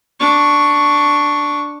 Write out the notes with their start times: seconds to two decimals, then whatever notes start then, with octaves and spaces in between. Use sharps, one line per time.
0.19 D4 C#6